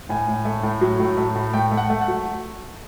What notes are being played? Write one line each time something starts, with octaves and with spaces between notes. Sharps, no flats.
A2 G#5
A2
A3
A2
F#3
A2
A3
A2
A3 G5
A3
F#5
A3
F#5
F#3